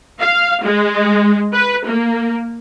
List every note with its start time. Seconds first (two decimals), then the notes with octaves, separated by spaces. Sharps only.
0.19 F5
0.63 G#3
1.53 B4
1.87 A#3